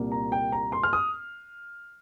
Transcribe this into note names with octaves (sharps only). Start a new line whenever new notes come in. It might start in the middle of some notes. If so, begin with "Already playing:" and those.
Already playing: C2 A#2 A#3
A#5
G5
A#5
C6
F6
D#6